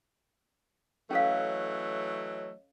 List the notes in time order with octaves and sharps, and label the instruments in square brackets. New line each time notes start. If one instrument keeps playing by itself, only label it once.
[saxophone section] E3 F#3 A3 [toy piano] C#4 A4 F5 [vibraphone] C#5 D#5